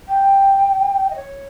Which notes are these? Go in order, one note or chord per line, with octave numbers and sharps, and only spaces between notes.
G5
D#5
C#5